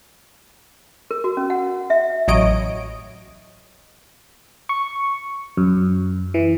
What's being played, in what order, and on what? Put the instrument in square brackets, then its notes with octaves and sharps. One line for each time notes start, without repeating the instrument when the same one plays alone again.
[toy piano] A#4
F#4
C#4
F#5
E5
[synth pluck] A1 F#3 C#5 D#5 D7
[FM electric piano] C#6
F#2
E3